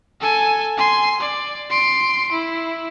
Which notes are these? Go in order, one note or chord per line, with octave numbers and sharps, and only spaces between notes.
A4 G#5
G#5 C6
D5
C6 D7
E4